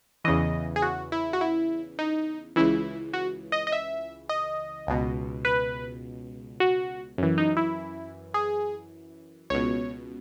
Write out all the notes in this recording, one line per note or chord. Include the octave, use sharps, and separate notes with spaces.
E2 C#3 E3 D#5
G#4
F#4
E4
F#4
E4
D#4
C#2 C#3 E3 E4
F#4
D#5
D#5
E5
D#5
C#2 B2
B4
F#4
F#2 E3
D#4
E4
G#4
C#2 B2 C#5